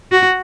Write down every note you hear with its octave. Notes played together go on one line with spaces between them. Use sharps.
F#4